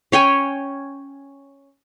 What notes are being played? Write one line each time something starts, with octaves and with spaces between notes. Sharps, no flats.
C#4 C#5 G5 G#5